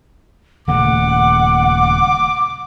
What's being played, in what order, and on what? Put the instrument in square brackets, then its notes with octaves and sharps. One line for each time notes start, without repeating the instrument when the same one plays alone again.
[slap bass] D#1 C#3 A3 [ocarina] F#5 [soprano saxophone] D6